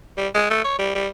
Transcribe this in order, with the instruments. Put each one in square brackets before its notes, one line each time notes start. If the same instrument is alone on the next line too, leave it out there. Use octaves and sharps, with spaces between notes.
[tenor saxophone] G3
G#3
A3
C#5
G3
G3